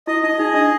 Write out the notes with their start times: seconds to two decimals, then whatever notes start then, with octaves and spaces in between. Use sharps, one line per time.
0.07 E4 D#5
0.23 D#4 D#5
0.39 D#4 G#4
0.54 D4 D#5